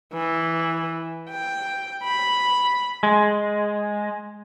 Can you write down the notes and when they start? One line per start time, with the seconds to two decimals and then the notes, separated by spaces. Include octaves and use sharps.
0.13 E3
1.29 G5
2.03 B5
3.03 G#3